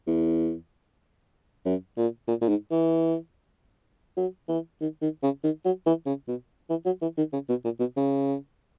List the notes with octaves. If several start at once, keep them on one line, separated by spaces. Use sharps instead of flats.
E2
F#2
A#2
A#2
A#2
G#2
E3
F#3
E3
D#3
D#3
C#3
D#3
F#3
E3
C#3
B2
E3
F#3
E3
D#3
C#3
B2
A#2
B2
C#3